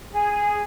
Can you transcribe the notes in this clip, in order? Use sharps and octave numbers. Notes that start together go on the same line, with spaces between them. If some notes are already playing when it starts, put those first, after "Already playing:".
G#4